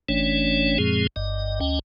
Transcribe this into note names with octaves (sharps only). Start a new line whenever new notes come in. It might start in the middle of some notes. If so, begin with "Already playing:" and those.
G1 E3 A3 C#4 D4 C#5
F#2 A#2 F3 G#3 C4 G#4
G1 G2 D#5
D2 C#4 D#5 G5